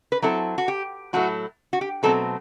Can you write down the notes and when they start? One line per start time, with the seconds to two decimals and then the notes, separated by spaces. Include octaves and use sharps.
0.12 B4
0.22 F#3 C4 E4 A4
0.58 F#4
0.68 G4
1.13 A2 F#3 A3 E4 F#4
1.73 F#4
1.81 G4
2.03 B2 F#3 A3 C4 A4